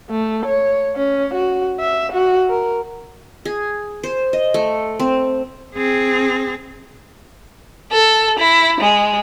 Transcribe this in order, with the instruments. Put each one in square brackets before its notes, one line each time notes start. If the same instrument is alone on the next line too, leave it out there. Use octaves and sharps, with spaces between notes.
[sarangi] A3
C#5
C#4
F#4
E5
F#4
A#4
[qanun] G#4
C5
D#5
A3
C4
[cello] C4 G#4
[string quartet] A4
E4
G#3